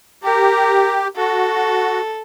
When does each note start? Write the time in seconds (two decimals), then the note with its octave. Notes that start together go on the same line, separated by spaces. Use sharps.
0.24 G4 A#4
1.17 F#4 A4